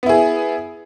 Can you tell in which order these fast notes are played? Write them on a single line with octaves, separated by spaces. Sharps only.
B3 E4 G#4